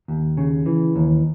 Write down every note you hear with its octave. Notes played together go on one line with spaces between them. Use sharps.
D#2
C#3
E3
D#2